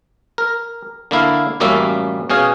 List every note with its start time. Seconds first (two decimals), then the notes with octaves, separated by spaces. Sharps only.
0.38 A#4
1.11 D3 A#3 E4 F5
1.60 A1 F#2 G3 A#3 C#4 E5
2.30 B2 C#4 G#4 F5